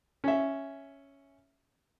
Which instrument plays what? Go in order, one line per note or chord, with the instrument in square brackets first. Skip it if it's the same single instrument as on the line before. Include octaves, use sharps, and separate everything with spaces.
[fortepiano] C#4 E5